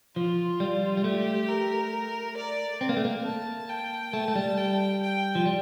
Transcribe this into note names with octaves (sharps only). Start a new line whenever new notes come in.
F3 F4
G3
G3
A3 G4
A#4
D5
C4
A#3
A3
A#3
A5
G5
A3 A5
A3
G3
G5
G5
F3
G3